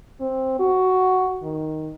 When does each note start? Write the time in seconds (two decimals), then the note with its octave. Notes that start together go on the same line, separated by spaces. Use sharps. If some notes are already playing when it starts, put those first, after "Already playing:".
0.20 C4
0.59 F#4
1.43 D#3